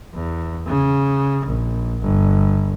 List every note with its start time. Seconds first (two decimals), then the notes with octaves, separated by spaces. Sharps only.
0.15 E2
0.67 C#3
1.47 A#1
2.02 G1